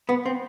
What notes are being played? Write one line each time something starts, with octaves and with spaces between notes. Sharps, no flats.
B3
C4